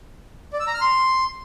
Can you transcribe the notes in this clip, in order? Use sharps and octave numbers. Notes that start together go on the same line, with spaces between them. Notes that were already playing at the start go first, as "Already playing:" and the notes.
D5
E6
A#5
F6
C6